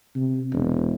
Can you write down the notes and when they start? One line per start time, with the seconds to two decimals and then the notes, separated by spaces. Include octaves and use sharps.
0.16 C3
0.53 E1